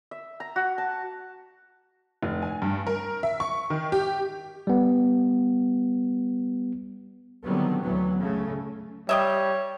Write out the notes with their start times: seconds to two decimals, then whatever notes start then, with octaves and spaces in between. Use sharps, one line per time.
0.11 E5
0.40 A#5
0.56 F#4
0.78 A5
2.23 F1
2.42 G#5
2.62 G2
2.87 A#4
3.23 E5
3.40 C#6
3.70 D#3
3.92 G4
4.67 G3 B3
7.46 D3 D#3 F#3 G3 B3 C4
7.82 D2 E3 F#3 B3
8.18 C#3 A3
9.09 G3 G4 C#5 D#5 E5